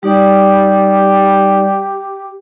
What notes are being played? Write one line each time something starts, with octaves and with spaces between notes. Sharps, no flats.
G3 D#4 G4 D5